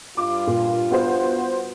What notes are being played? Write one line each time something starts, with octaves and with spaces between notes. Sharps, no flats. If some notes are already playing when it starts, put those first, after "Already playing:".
G2 F4 D6
A#2
B3 F#4 C5